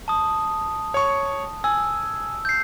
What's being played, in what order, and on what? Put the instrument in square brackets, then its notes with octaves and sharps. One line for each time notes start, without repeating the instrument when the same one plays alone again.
[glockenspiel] A5 D#6
[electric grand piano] C#5 C#6
[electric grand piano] G#5 [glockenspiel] E6
[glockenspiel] G6 C7